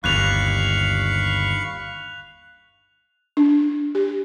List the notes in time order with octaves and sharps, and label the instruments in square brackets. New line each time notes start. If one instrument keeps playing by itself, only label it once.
[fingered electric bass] G1 [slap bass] D#2 [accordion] F5 B5 C#6 [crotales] F#6 F7
[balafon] D4
G4